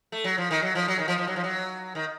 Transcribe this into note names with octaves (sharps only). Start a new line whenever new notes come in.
A3
F#3
F3
D#3
F#3
F3
F#3
D#3
F3
F3
F#3
F3
F#3
D#3